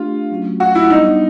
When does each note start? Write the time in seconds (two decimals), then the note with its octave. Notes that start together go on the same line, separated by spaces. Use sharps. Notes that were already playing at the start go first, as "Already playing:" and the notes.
Already playing: A3 D4 F4 G4
0.30 F#3 A3 C#4 F#4
0.60 F#4
0.75 E4
0.90 G3 B3 D4 D#4